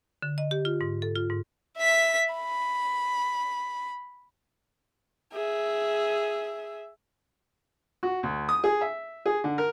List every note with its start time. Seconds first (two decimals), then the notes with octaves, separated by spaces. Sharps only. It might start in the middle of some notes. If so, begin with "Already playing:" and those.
0.22 D3
0.38 D#5
0.51 G4
0.65 F4
0.81 G#2
1.02 A4
1.15 F4
1.30 G#2
1.78 E5 B6
2.34 B5
5.33 G#4 E5
8.03 F#4
8.23 D2
8.49 D#6
8.64 G#4
8.81 E5
9.26 G#4
9.44 D3
9.58 A#4